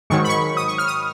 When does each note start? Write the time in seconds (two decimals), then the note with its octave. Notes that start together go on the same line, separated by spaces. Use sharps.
0.10 G#2 D#3 F#3 C#6
0.24 B5
0.29 C#6
0.57 D#6
0.68 C#6
0.78 F6
0.88 D#6